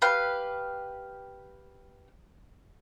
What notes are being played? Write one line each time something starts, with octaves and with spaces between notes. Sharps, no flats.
G4 B4 F5